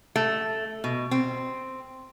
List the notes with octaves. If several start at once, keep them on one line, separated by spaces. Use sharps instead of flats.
A3
B2
C4